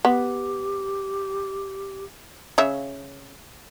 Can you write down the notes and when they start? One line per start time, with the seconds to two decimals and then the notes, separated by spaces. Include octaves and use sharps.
0.05 B3 G4
2.58 C#3 C#5 E5